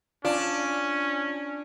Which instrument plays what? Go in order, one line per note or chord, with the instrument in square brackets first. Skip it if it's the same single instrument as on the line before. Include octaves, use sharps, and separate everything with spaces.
[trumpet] C#4 [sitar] D4 [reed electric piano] F4